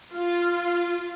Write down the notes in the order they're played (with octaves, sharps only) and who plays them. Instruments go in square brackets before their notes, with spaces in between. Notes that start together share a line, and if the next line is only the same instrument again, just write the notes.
[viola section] F4